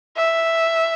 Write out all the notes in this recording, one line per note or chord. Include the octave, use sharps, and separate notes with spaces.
E5